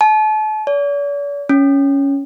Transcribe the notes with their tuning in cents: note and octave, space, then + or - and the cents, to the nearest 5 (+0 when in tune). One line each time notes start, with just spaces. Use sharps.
A5 -35
D5 -45
C#4 +5